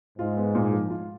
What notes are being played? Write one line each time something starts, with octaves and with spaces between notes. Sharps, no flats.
G#2 F4
B3
A#2
F3
F4